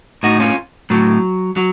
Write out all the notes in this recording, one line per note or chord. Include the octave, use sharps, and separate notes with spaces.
A2 D#4 F#4
C#4 F4
A2 F#3
F#3